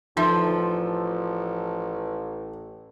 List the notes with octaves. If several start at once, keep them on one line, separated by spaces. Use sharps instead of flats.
A1 F3 D#4 A4 E5